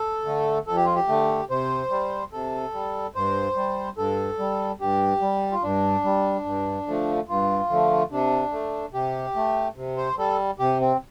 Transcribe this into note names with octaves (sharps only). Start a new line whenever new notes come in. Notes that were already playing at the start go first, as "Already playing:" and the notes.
Already playing: A4
D3 A3
F2 A4
G4
F4
G4
D3 A3
C3 C5
G3
C3 A4
G3
G2 C5
G3
G2 A4
G3
G2 G4
G3
F4
G2 D4
G3
G2
D3 F3 A3
G2 F4
D3 F3 A3
C3 D4
A3
C3 G4
A3
C3
C5
G3 A4
C3 G4
C4